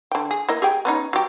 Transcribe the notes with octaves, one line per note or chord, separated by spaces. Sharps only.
D3 G5
G#4
A#3 E4 D#5
G4 G#4 G5
B3 C#4 D#4
F#3 G4